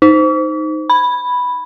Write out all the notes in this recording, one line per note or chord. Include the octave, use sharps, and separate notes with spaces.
D#4
B5